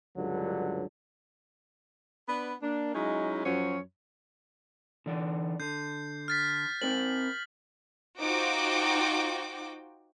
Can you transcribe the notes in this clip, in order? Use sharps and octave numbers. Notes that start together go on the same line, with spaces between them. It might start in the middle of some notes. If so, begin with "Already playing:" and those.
C#2 G2 D3 F#3
B3 D4 B4
A#3 D4
F#3 G#3 C#4 D#4 E4
F#2 F3 F#3 C#4 C#5
D3 E3 D5
D3 G6 C7
F6 A6 B6
C4 A#4 C5 F#7
D#4 F4 F#4 C5 G5 D6